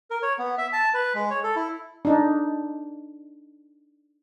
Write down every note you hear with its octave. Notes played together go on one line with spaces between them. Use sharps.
A#4
C#5
B3
E5
A5
B4
G#3
C#5
A4
E4
D4 D#4